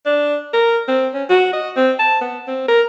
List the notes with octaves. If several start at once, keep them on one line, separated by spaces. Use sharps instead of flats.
D4
A#4
C4
C#4
F#4
D#5
C4
A5
B3
C4
A#4